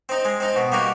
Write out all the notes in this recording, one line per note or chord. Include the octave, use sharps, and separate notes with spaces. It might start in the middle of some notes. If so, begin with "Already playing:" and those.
C4 D#4
G#3
C4 D#4
B2
G3 A#3 D#4 F#4